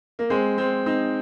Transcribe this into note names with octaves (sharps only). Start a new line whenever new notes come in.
A#3
G#3 C4
G#3 C4
C4 D#4